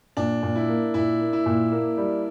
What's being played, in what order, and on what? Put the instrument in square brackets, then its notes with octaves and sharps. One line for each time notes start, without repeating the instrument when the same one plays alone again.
[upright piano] A#2 [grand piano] D4
[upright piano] A#2
[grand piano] E4
[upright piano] A#3
[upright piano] A#2 [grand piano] E4
[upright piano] A#3
[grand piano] E4
[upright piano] A#2
A#3
G3